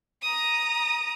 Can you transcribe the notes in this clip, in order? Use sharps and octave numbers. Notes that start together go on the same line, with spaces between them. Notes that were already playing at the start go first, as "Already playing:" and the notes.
A#5 D#6